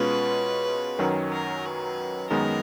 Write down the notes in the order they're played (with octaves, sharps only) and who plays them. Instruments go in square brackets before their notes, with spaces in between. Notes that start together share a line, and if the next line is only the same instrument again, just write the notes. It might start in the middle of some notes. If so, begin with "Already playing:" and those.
Already playing: [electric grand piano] B2 G#3 C#4 F4 [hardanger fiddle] B4
[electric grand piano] F#2 D#3 F#3 C#4
[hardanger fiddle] A#4
B4
[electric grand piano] F#2 D#3 G#3 B3 [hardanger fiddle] A#4